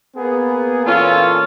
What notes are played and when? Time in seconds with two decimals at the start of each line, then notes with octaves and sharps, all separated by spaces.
0.16 A#3 B3 G#4
0.86 A#2 E3 C#4 F4 A4